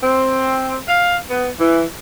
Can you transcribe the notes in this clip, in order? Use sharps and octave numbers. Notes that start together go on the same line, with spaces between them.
C4
F5
B3
E3